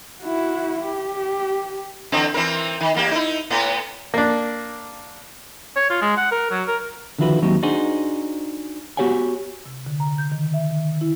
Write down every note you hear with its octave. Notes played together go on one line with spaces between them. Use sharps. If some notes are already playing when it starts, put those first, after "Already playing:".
E4 F#4
G4
D3 E3 C4
E3 C4 A#4
D#3
E2 A#3 G4
D#4 E4
A2 B3
A#3 D4
C#5
F4
G#3
F#5
A#4
F#3
A#4
D3 D#3 F3 E4 F#4 B4
D#2 F#3 C4 D#4 G4
D4 D#4 F#4 G#4 C5
B3 F#4 G4 C#5 F#5 G#5
C3
D3
A#5
G6
D#3
E5
D#3
E4